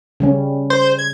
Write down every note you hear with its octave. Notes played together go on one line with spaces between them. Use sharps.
C#3 G3 C#4
C5
G#6